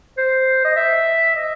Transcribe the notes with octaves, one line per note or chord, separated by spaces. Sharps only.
C5
D#5
E5
D#5